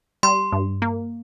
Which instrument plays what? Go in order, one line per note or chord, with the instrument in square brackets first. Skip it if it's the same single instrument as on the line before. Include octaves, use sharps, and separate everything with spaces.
[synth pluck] G3 [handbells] C6
[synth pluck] G2
A#3